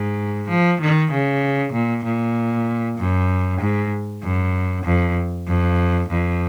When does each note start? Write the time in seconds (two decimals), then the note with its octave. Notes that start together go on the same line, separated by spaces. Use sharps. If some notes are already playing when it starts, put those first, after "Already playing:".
Already playing: G#2
0.49 F3
0.81 D#3
1.12 C#3
1.73 A#2
2.05 A#2
2.98 F#2
3.61 G#2
4.23 F#2
4.85 F2
5.48 F2
6.10 F2